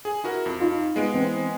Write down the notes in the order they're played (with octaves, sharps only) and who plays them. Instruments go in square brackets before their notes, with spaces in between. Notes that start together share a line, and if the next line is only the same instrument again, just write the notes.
[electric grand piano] G#4
E4 F#4 A#4
F2
[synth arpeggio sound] D#4 F4
[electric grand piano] G#3 B3 D7
[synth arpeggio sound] E3 C4